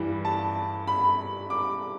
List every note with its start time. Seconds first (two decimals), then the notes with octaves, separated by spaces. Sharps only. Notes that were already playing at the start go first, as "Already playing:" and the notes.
Already playing: G2 E3 G3
0.25 A5
0.87 B5
1.50 D6